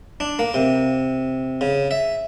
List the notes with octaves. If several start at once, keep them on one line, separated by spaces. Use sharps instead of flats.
D4
A#3
C3
C#3
E5